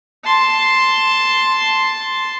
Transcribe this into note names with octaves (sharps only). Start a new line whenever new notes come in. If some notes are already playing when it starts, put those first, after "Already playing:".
A5 C6